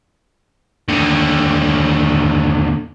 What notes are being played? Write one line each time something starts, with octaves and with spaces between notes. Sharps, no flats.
D#2 D3